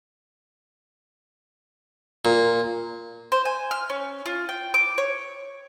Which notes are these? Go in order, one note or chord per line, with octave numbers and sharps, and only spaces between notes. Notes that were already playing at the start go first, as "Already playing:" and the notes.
A#2
C5
G#5
F6
C#4
F4
G5
D6
C#5